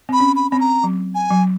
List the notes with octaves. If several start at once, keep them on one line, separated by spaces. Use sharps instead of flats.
C4 B5
C#4
B5
C4 B5
A#5
F#3
G#5
F#3